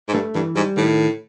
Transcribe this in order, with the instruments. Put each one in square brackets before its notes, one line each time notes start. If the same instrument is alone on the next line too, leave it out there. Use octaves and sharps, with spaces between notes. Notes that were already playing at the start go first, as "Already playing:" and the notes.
[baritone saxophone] G#2
[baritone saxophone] G2 [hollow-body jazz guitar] A3
[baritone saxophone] G2 [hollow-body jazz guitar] E3
[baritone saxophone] G#2 [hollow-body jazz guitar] G3
[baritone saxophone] A2 [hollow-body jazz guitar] D#3